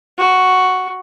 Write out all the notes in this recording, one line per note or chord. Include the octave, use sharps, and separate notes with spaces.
F#4